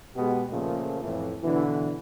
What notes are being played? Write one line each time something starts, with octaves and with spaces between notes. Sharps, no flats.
B2 G#3 B3 G4
A#2 C#3 F3 A3 A#3
F2 A2 E3
B2 D3 E3